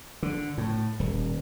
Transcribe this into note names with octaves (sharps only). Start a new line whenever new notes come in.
D3
A2
D#1